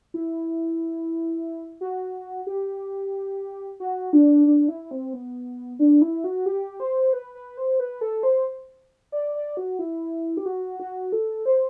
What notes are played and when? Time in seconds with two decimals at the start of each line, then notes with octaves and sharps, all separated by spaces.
0.14 E4
1.81 F#4
2.47 G4
3.80 F#4
4.13 D4
4.46 D4
4.68 E4
4.91 C4
5.14 B3
5.79 D4
6.02 E4
6.24 F#4
6.46 G4
6.80 C5
7.13 B4
7.35 B4
7.57 C5
7.80 B4
8.01 A4
8.23 C5
9.12 D5
9.35 D5
9.57 F#4
9.79 E4
10.37 G4
10.46 F#4
10.79 F#4
11.12 A4
11.46 C5